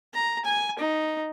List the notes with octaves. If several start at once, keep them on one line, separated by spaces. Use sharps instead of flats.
A#5
G#5
D#4